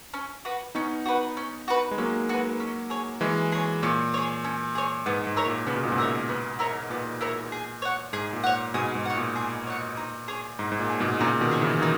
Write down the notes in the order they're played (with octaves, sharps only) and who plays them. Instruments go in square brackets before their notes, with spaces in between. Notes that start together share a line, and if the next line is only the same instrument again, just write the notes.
[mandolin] C#4
F#4 B4
[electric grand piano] B3 D#4 [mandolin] C#4
[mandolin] F#4 B4
C#4
F#4 B4
[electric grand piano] G#3
[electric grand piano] F#3 A#3 [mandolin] C#4
[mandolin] F#4 B4
C#4
G#4 C#5
[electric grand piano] E3 G#3 [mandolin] C#4
[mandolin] G#4 C#5
[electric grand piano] A#2 [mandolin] C#4
[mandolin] G#4 C#5
C#4
G#4 C#5
[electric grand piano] G#2 [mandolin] B3
[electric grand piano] G#2
[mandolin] E4 A#4 C#5
[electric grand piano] A#2
[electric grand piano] C#3 [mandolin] B3
[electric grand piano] B2
A#2
G#2 B2
[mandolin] E4 A#4 C#5
B3
E4 A#4 C#5
[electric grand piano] A#2 [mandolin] B3
[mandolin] E4 A#4 C#5
G#4
C#5 F#5
[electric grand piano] G#2 [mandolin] G#4
[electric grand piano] A#2
[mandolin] C#5 F#5
[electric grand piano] G#2 B2 [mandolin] G#4
[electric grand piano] G#2
[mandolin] C#5 F#5
[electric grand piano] A#2
[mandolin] G#4
C#5 F#5
D#4
G#4 C#5
[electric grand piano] G#2 [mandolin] D#4
[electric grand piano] G#2
A#2
[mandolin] G#4 C#5
[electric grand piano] G#2 B2
[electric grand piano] A#2 C#3 [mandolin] D#4
[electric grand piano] B2 D#3
[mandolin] G#4 C#5
[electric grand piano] C#3 E3
E3
[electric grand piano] D#3 F#3 [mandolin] D#4